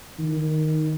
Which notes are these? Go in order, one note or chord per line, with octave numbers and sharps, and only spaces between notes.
D#3